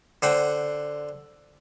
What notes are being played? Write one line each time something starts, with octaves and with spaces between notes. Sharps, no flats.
D3 C5 F#5 G5